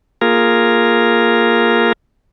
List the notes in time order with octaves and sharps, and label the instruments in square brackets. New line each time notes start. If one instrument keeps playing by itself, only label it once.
[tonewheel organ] A#3 F4 G#4 A#4